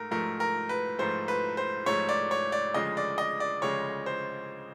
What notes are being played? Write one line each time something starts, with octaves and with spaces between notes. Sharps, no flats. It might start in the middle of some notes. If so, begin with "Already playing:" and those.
Already playing: G#2 A3 A#4
G#2 F3 A3 A#4
A#4
B4
G#2 F3 A3 C5
B4
C5
G#2 F3 A3 C#5
D5
C#5
D5
D2 C#3 F3 G#3 D#5
D5
D#5
D5
D2 C#3 F3 G#3 C#5
C5